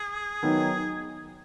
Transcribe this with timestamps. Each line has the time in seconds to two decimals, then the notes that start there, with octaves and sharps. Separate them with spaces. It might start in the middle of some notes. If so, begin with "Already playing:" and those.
Already playing: G#4
0.43 D#3 F#3 B3 D#4